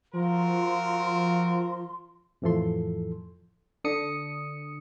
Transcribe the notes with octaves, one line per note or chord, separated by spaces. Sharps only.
F3 C4 F4 F#4 A#4 C6
F2 A2 E3 F3 A4 C6
D3 D4 D#6 C#7